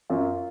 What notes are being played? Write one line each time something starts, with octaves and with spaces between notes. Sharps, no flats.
F#2 F4